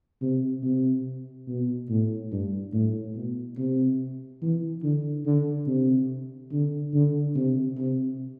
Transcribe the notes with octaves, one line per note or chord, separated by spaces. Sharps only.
C3
C3
B2
A2
G2
A2
B2
C3
E3
D3
D3
C3
D3
D3
C3
C3